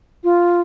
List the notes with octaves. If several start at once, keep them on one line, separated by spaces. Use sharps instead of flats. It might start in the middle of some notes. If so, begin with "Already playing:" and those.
F4